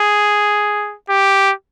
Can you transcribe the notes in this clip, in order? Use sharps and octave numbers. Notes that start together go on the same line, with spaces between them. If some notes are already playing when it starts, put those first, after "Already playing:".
Already playing: G#4
G4